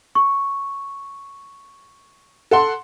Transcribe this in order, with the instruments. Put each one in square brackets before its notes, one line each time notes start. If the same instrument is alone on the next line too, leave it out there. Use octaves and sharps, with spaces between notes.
[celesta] C#6
[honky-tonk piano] A4 F#5 C6